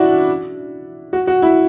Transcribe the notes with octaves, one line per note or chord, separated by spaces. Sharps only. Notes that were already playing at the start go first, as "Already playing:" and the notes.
Already playing: D4 E4 F#4
F#4
F#4
E4